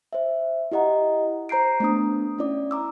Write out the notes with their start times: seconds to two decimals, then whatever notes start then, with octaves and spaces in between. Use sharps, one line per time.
0.13 C5 E5
0.72 E4 G4 D#5 F#5 A#5
1.49 C5 A#5 G6 C7 D7
1.80 A3 B3 D4 D#6
2.38 C#4 E4 D5 D6
2.71 A#5 D6 E6